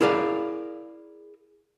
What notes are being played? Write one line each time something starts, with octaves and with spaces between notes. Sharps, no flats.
E4 G#4 A#4 D5 F5